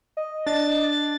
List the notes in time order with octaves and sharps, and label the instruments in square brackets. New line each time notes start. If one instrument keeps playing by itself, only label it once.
[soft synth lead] D#5
[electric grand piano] D4 [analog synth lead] A6